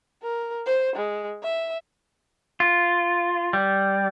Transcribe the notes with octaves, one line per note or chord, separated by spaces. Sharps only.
A#4
C5
G#3
E5
F4
G3